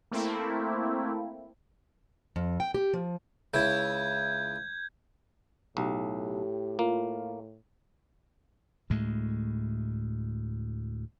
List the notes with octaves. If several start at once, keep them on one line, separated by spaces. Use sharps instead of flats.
A3 A#3 C4 E4
F2
G5
G4
F3
C#2 C#3 E4 G6 G#6
B1 A2 G4
A#3 F4
D2 A2 G#3